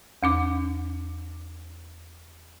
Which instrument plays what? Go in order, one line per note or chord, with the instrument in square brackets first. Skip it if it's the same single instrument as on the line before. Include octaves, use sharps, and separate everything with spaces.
[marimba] E2 C#4 D6